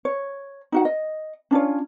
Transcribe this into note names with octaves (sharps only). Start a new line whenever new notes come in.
C#5
D#4 F#4 F#5
D#5
C#4 D4 F4 C#5